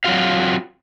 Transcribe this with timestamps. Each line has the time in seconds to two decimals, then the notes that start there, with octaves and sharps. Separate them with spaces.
0.04 F#3 C4 F4 F#4 F5